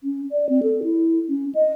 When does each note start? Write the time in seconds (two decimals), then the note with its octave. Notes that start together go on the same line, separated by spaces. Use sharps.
0.04 C#4
0.32 D5
0.49 C4
0.63 A4
0.84 E4
1.29 C#4
1.55 D#5